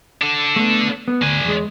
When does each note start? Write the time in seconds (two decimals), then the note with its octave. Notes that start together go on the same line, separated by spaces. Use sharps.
0.21 D4 A4
0.56 A3 B3
1.08 B3
1.22 D2 D4 G#5
1.45 E2 G#3